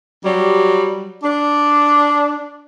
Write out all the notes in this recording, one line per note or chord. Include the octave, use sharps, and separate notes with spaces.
F#3 G3
D4